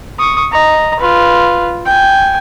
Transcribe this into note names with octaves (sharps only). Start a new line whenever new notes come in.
C#6 D#6
D#5 A#5
F4 B4
G5 G#5